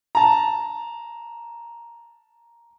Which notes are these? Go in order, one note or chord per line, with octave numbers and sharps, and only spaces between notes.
A5 A#5